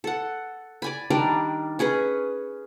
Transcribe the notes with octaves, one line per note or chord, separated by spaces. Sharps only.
A4 F#5
D5 G#5 B5
D#3 G3 D4 A#4
C#4 G#4 B4 D#5